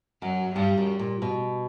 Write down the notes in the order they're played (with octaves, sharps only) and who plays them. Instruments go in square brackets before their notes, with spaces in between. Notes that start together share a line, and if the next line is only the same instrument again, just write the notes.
[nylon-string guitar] F#2 [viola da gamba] F#3
[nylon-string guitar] G2 [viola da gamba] G3
[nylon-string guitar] F#2
A#2
B2